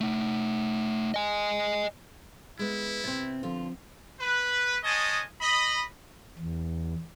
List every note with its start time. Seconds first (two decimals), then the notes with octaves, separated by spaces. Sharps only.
0.01 A3 D#4
1.14 D#5 G#5
2.59 G#3 B3 E4
3.04 C3 C4
3.43 D3 F3 C4 F4
4.20 B4
4.83 G#3 C#4 D#5 G#5 A5
5.40 D#5 B5
6.39 E2